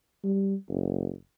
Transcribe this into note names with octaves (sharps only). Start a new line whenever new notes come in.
G3
F#1